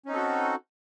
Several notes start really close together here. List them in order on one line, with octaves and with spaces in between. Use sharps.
C#4 D#4 C4 A4 F#4